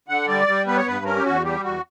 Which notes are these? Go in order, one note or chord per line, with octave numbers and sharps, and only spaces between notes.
D3 F#5
G3 D5
G3
B3 B4
C#5
G2 B4
C#4 A#4
G4
E2 F#4
G3 G4
E2 F#4